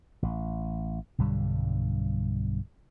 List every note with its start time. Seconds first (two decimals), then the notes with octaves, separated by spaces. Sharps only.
0.23 A1
1.18 B1 G2 D3 G3